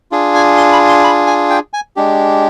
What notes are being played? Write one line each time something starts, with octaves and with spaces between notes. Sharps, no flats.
D4 F4 G#4
G#5
C6
B5
C6
B5
G#5
G5
G#5
G#3 D4 G4